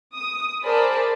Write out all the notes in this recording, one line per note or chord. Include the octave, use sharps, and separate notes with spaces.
D#6
G#4 A#4 C5 D5 A5 B5